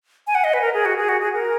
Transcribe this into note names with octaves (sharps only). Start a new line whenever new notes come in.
G#5
F#5
D#5
B4
A#4
G#4
F#4
G#4
F#4
G#4
A#4